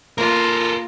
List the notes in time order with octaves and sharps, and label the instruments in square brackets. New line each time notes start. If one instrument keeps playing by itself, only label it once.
[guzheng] A#3 [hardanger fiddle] F4 [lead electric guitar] A4 A#4